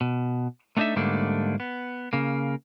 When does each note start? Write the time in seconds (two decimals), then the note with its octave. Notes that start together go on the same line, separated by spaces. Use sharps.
0.01 B2
0.77 A3 B3 D4 D#4 A4 E5
0.96 G#2 D3 G3 A3 A#3 D4
1.60 B3
2.13 C#3 A#3